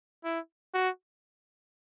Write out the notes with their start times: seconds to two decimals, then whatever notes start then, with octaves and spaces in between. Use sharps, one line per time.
0.25 E4
0.74 F#4